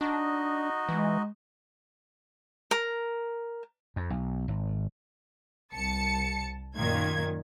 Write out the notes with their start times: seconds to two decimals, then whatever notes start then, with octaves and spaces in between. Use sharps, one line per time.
0.01 D4 D#4 F#4 D#5
0.89 E3 G#3
2.71 A#4
3.96 F2
4.10 B1
4.48 G#1
5.73 C2 A5 C#7
6.76 F#2 A#2 D#3 G#6